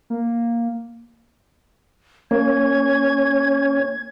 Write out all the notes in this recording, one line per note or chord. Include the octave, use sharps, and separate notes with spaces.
A#3
A#3 C#4 G#6